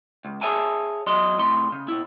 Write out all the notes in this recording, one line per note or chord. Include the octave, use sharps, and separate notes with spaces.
C#2
G#4 B4 C#5 E5 G#5 A5
E2 F#3 D#5 C6
A2 C3 C6
C#3
B2 E4